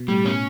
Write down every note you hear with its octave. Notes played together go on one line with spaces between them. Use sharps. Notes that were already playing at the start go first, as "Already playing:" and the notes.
Already playing: B2
A2 G3
B2 C#4